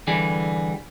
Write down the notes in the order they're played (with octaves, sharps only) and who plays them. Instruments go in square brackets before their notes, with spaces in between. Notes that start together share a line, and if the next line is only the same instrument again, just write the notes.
[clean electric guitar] D3 E3 G3 G#4